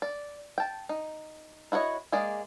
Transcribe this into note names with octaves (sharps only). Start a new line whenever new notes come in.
D5
G5 A5
D#4
E4 F#4 B4 C#5 D#5
G#3 A#3 G#4 D5